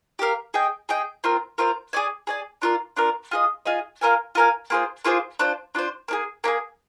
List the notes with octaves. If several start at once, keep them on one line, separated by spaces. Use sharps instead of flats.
G4 A#4 F5
G#4 D#5 G5
G#4 D#5 G5
C4 F4 A#4
C4 F4 A#4
G#4 D5 G#5
G#4 D5 G#5
D4 F4 A#4
D4 F4 A#4
F4 G#4 D#5
F4 G#4 D#5
F4 A#4 F5 G#5
F4 A#4 F5 G#5
A#3 F4 G#4 C5
A#3 F4 G#4 C5
D4 F4 C5
D4 F4 C5
A#3 D4 G#4
A#3 D4 G#4